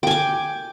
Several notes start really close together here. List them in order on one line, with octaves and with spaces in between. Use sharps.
G5 G#5 D6